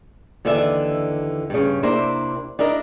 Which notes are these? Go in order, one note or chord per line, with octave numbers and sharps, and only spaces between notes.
D#2 D3 E3 D4 D5 E5
G2 C#3
C3 A#3 D4 E4 A#4 C5
D4 E4 A#4 D#5